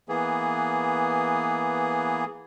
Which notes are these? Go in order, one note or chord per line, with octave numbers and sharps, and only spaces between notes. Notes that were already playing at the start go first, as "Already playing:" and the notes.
E3 A#3 B3 G#4